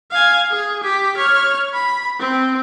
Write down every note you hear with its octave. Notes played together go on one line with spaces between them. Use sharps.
F5 G#5
G#4
G4 B6
C#5 F6
B5
C4